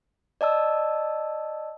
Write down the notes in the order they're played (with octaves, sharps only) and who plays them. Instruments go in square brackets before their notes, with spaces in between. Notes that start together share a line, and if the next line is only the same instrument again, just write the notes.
[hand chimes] D5 D#5 A5 E6